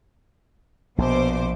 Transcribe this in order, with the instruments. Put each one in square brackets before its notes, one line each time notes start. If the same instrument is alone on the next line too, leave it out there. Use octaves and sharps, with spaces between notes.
[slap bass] A#1 [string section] B2 C5 D6